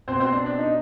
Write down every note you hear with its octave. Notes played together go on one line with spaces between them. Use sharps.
B2 C4 C5
C4 C5
D4
D4
D#4